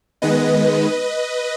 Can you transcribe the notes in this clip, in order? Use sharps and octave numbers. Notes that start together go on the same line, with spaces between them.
D#3 G#3 B3 B4 D#5